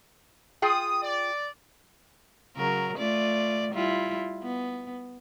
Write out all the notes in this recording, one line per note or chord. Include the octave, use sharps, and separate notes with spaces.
F4 G#4 G5 D#6
D5
C#3 F#3 A#4
A3 F4 D5
G3 E4 F4
B3